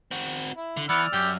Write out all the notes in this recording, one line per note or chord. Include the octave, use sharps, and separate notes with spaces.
C4 F#4
E4
D3
E3 B3 D5 E6 F6
F#2 G4